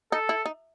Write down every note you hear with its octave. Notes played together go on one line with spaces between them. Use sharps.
D#4 A4
E4
D#4